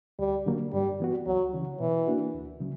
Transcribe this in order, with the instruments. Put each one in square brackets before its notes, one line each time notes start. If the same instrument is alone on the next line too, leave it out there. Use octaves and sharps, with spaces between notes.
[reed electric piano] D2 [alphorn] G3
[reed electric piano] D3 F#3 A#3
[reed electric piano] G2 [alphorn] G3
[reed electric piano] E3 B3 F#4
[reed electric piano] C#2 [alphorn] F#3
[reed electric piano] C#3 E3
[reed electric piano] B2 [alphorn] E3
[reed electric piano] A#3 D4 F#4
D2
C#3 F#3